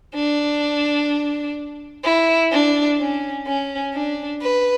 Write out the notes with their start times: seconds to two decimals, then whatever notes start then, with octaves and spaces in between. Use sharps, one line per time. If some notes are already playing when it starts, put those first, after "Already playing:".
0.15 D4
2.04 E4
2.52 D4
2.99 C#4
3.47 C#4
3.94 D4
4.42 B4